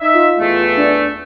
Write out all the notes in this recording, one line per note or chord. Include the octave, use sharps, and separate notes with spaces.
D#4 E5
F4
E2 A3
D4